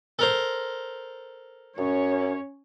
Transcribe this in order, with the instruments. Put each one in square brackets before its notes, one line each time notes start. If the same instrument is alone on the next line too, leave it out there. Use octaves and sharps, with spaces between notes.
[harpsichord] A4 A#4 C5
[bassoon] F#2 [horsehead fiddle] C#4 C#5